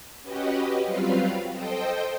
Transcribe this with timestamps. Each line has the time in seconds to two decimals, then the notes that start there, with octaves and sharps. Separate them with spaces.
0.22 C#4 F#4 G4 B4 D#5
0.84 F#3 G3 C4 F4 B4 F5
1.52 A4 C5 D#5 G5